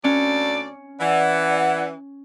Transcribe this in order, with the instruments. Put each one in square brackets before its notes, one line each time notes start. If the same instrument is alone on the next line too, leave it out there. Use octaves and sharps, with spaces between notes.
[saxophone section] D2 D5 [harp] C#4
[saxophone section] E3 [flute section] D5 F#5